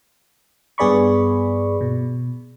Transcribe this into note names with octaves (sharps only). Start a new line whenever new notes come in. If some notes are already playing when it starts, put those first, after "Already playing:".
G2 B3 G#4 D5 B5 C#6
B2